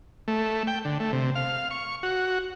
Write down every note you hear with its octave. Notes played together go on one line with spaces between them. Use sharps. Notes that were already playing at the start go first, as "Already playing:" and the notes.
A3
G5
D3
A3
C3
F5
C#6
F#4